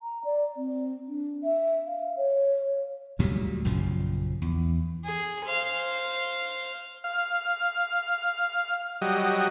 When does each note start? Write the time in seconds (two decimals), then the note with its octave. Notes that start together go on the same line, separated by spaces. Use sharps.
0.03 A#5
0.25 D5
0.57 C4
1.08 D4
1.44 E5
1.86 F5
2.17 C#5
3.19 D2 A#2 F#3 G3
3.65 A#1 F#2 C#3 F3
4.42 E2
5.05 G#4
5.45 C5 F5
7.04 F5
9.02 F#3 G3 D#5